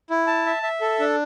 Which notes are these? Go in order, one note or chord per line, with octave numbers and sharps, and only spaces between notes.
E4
A5
E5
E5
A4
D4